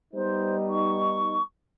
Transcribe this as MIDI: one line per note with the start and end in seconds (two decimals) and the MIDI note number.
0.13 1.38 55
0.13 1.38 59
0.13 1.38 63
0.13 0.56 72
0.69 1.41 85